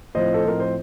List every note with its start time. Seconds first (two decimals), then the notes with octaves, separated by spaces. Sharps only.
0.15 A2 F3 C4 C5 D#5
0.34 A4
0.44 A2 F3 C4 A#4
0.60 C5